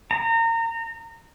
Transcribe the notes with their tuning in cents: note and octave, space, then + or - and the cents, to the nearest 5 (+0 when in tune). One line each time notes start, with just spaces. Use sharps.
A#5 -30